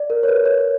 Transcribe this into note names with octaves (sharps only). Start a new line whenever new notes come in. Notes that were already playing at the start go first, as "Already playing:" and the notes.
Already playing: D5
A#4
C#5
B4
C#5